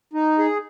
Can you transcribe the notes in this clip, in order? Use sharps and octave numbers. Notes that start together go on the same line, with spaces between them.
D#4
G#4